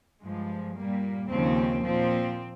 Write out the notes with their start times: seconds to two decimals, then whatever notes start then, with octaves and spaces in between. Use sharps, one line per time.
0.23 G2 F3 G#3
0.76 A#2 G3 A#3
1.30 D#2 C#3 F3 C4
1.84 A#2 F3 C4